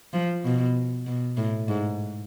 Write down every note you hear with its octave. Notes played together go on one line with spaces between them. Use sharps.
F3
B2
B2
A2
G#2